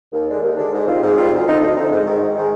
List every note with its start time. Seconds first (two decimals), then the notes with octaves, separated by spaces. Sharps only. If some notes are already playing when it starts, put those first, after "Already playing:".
0.12 D#2
0.28 D3 G#3 D4
0.42 D#2
0.57 D3 G#3 D4
0.73 G#2
0.87 D#3 G3 C4 F4
1.02 G#2
1.17 D#3 G3 C4 F4
1.32 D2
1.46 D3 F3 C4 D#4
1.61 D2
1.76 D3 F3 C4 D#4
1.91 G#2
2.05 D#3 G#3
2.20 G#2
2.35 D#3 G#3